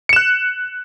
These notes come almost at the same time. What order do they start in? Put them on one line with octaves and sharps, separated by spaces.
C#7 E7 F#6